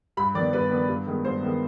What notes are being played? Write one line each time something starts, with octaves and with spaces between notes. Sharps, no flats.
G2 B5
D#3 B3 D5
G2 B4
D#3 B3
G2
D#3 G#3 B3
G2 C5
D#3 G#3 B3